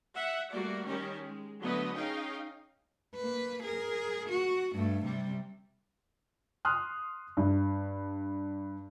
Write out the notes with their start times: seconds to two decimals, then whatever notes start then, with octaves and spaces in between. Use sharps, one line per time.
0.15 E5 F#5
0.51 G3 A3 A#3 F#4 D5
0.86 D#3 G3 C#4 G4 A#4
1.21 G#3
1.60 D3 F#3 A3 B3 B4 D#5
1.95 C#4 D#4 G#4 D#5 F5 G5
3.16 A#3 B4
3.63 G#4 A#4
4.29 F#4
4.75 G2 A3
5.05 C3 G3
6.65 C6 D#6 F6 F#6
7.37 G2